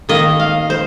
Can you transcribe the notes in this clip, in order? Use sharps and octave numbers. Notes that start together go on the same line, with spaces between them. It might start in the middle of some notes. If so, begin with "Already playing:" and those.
D#3 A#3 D#5
F5
C5